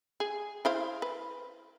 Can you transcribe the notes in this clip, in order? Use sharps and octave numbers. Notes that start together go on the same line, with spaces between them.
G#4
E4 C5 F5
B4